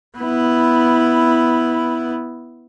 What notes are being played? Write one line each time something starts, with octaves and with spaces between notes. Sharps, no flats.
B3 E4